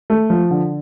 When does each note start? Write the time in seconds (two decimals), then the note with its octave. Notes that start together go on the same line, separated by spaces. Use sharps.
0.10 A3
0.30 F3
0.51 D3